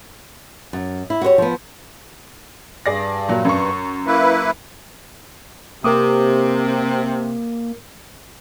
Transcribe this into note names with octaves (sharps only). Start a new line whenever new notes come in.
F#2
E4
F#4 G4 C5 C#5
F3 B3
G2 G#4 D5 A#6
A#2 F#3
F#2 C#6
A#3 E4 B4
C3 A#3 A#4 D6 D#6